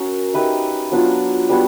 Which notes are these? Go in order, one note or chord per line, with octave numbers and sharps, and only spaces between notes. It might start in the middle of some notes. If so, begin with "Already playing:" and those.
Already playing: C#4 F#4 A#4
D#4 G4 B4 E5
F#3 B3 D4 F4
G3 B3 D4 F#4